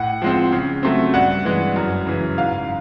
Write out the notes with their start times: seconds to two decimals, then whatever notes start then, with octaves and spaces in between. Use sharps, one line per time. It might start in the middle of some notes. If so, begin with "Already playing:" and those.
Already playing: A2 F#5
0.22 F3 G#3 C4
0.52 C#3
0.83 F#3 A3 C4
1.14 G2 F#5
1.45 E3 G#3
1.76 F#2
2.07 C#3 E3
2.38 G#2 F5